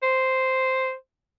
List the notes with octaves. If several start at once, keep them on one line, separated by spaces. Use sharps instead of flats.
C5